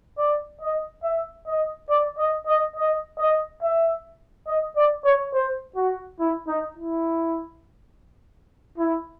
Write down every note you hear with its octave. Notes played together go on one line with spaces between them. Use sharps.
D5
D#5
E5
D#5
D5
D#5
D#5
D#5
D#5
E5
D#5
D5
C#5
C5
F#4
E4
D#4
E4
E4